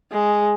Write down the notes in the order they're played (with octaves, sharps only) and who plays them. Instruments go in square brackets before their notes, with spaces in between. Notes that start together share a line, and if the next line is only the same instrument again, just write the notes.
[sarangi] G#3